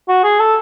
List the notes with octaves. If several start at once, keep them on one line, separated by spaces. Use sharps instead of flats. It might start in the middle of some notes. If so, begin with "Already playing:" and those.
F#4
G#4
A4